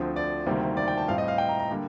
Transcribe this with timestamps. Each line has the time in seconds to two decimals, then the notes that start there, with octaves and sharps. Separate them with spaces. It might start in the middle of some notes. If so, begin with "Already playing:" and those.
Already playing: D2 D3 F3 C4
0.16 D5
0.46 D2 C3 D#3 G3 A#3
0.77 D5
0.88 G5
0.97 A5
1.08 A2 G3 C4 F5
1.18 D#5
1.28 F5
1.38 G5
1.49 A#5
1.59 A#5
1.71 D3 G3 A#3